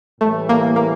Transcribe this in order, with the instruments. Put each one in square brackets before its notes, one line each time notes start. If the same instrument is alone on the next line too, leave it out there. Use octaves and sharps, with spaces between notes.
[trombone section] A2 E3 G3 [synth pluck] A3
[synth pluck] A#3
A#3